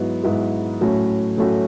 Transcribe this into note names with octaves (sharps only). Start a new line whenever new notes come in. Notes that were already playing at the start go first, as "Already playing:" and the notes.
Already playing: G#2 F#3 B3 E4
G#2 F#3 B3 E4
A2 F#3 A3 C#4 F#4
A2 F#3 A3 C#4 F#4